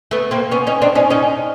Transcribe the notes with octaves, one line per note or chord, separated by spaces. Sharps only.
A3 B3
A#3 C4
B3 C#4
C#4 D#4
C4 D4
C#4 D#4
C#4 D#4